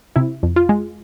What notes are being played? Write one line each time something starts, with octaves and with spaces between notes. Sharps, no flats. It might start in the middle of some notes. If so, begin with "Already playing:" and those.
C3 E4
F2
F4
G#3